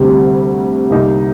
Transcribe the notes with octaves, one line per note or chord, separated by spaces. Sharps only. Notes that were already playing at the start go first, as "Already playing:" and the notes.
Already playing: D2 C3 G3
C2 C3 G3 A#3 D#4